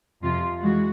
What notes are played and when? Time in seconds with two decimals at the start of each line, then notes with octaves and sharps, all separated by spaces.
0.22 F2 C3 F3 F4
0.61 E3 G#3 F#4